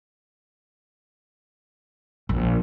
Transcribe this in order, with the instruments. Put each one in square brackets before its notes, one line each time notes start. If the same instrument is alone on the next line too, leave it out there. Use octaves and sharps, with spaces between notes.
[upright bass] A#1